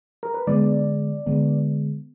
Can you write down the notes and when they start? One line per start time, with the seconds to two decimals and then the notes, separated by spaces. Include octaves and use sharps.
0.23 A#4
0.34 B4
0.47 D3 G#3 B3 D5
1.26 D3 G#3 B3